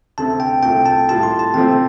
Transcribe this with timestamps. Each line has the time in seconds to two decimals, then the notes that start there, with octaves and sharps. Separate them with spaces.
0.18 D2 C3 A3 C4 A5
0.40 G5
0.63 C2 C3 A3 F4 A4 G5
0.86 A5
1.08 A2 G3 F4 A4 A5
1.23 C6
1.39 A5
1.54 C3 F3 A3 C4 G5